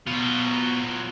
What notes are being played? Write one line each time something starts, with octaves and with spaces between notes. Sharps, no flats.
B2 F#3 F4